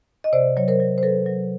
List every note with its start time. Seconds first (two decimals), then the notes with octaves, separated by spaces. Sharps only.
0.24 D#5
0.33 C3 C5 D5
0.57 F#3 C#5
0.68 A#4 C5
0.80 F#3
0.98 C5
1.03 F#3 A4 B4
1.26 F#3